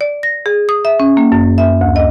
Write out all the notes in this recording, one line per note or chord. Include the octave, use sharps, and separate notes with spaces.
D5
A#6
G#4
D#6
E5
C#4
A#3
F#2
E5
D2
D#5